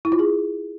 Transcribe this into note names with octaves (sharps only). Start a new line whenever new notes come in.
E4
F4
G#4